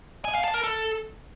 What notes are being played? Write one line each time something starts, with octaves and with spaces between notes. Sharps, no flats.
G#5
F5
A5
A#4
A4